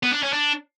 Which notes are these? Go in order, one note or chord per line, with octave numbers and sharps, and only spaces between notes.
B3
D4
C#4
D4